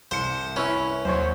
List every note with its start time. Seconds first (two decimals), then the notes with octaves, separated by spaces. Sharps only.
0.11 C2 C5 C#7
0.56 C#4 E4 B4
1.05 D#2 F#3 C5 C#5